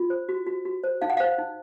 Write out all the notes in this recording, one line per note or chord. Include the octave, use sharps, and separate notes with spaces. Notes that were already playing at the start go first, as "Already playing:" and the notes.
Already playing: F4
C5
F#4
F#4
F#4
C5
D#4 F5
F#5
C5 F5
D#4